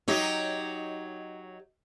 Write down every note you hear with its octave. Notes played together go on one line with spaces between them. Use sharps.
F#3 D#4 G4 C#5 D#5